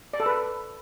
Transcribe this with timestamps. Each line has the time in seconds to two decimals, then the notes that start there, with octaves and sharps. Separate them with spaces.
0.13 D5
0.20 A4
0.26 B4